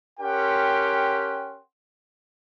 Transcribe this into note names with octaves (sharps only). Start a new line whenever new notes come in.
C#4 G4 A#4 F#5 G5 C6